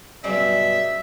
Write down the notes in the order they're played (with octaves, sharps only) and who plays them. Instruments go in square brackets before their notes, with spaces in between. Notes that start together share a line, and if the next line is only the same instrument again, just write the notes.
[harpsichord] B1 G2 C#3 [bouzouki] D#4 D5 [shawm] E5